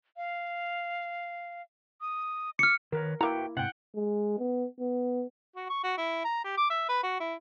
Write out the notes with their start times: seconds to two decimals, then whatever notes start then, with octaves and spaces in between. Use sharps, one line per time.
0.17 F5
2.01 D#6
2.59 D6 F6 C#7
2.92 D#3 A#4 B4 C#5
3.21 A#3 E4 F#4 B4 G5 A#5
3.57 G#2 C3 F#5 G5
3.95 G#3
4.39 B3
4.80 B3
5.56 F#4
5.69 C#6
5.83 F#4
5.98 E4
6.24 A#5
6.44 G4
6.57 D6
6.70 E5
6.89 B4
7.03 F#4
7.20 E4